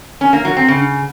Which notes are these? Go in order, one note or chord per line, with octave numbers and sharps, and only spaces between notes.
C#4
A#3
F#3
C4
C#3